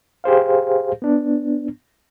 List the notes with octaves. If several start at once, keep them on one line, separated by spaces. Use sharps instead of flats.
G4 G#4 C5 F5
B3 D4